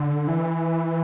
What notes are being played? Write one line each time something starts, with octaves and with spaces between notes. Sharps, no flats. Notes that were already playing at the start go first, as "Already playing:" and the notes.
Already playing: D3
E3